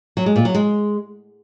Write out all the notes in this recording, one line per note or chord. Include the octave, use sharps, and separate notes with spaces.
F#3
G#3
A#2
F#3
G#3